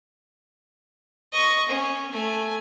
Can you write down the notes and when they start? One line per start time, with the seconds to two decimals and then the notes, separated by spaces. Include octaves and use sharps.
1.33 D#5 C#6
1.69 C#4
2.12 A3 G#5